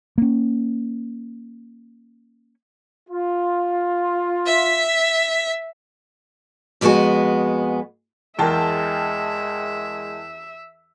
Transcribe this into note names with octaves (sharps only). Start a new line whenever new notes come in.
A#3 C#4
F4
E5 B6
F2 G3 G#3 B3 F#4 G#5
E2 G#3 A#4 E5 G5 A5